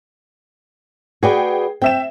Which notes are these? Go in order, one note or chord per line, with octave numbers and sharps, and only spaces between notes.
F#4 G#4 B4 D5 G5
C4 E5 G5 E7